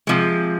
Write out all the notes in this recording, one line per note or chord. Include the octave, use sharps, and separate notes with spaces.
C3 F3 G#3